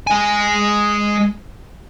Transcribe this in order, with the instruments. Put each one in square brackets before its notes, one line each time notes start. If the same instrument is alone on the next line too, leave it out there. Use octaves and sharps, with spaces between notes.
[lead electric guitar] G#3 G#5